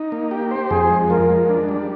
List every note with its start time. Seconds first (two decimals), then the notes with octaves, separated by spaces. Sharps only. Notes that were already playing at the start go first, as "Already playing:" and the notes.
Already playing: D#4
0.12 A#3
0.31 G4
0.51 C5
0.70 F2 G#4
0.90 G#3
1.10 F3 A#4
1.30 G#3
1.49 D4
1.69 G3